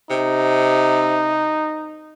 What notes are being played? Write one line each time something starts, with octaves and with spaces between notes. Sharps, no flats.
C3 D#4